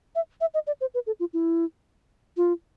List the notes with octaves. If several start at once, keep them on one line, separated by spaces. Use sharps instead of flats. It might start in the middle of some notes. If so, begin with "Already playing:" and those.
E5
E5
D#5
D5
C5
B4
A4
F4
E4
F4